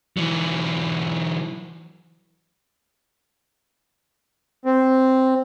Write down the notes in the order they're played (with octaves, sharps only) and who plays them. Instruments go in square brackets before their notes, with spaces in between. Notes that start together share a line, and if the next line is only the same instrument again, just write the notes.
[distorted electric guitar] E3 F#3
[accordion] C4